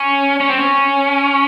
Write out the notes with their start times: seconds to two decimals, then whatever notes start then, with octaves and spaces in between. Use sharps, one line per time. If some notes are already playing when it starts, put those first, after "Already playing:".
Already playing: C#4
0.40 C#4
0.49 C4
0.59 C#4